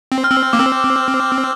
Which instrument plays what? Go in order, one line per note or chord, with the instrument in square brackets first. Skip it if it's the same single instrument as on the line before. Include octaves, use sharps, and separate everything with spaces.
[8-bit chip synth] C4
[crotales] F6
[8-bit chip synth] C4 [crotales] E6
[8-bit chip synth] A#3 [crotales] D6
[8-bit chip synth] C4 [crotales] E6